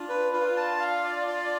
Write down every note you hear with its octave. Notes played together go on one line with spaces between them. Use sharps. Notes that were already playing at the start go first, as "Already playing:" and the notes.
Already playing: D4 F4
B4
D4 F4 B4
A5
F5
D5
D5